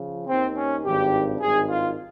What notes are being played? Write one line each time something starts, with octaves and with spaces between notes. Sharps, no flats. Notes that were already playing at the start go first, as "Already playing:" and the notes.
Already playing: C#3 F3
D#2 D#3 C4
C#4
G#1 G2 D#3 G4
G#1 G2 D#3 G#4
F4